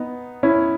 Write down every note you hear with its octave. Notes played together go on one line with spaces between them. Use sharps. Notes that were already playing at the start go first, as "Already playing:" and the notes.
Already playing: B3 D#4
C#4 E4